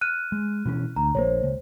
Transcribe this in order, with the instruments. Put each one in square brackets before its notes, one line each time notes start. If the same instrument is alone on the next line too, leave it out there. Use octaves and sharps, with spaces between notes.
[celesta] F6 F#6 D#7
[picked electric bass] G#3
B2 E3 C#4
[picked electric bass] D2 [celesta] A#5
[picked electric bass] A#1 F3 A#3 [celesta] C5 C#5
[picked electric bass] C#2